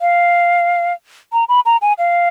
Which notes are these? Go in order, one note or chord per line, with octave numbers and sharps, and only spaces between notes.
F5
A#5
B5
A#5
G#5
F5